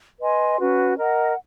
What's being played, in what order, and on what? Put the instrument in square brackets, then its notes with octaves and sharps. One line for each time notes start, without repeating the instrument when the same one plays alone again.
[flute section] B4 D#5 G#5 C6
C#4 F#4 B4
A#4 D#5 F#5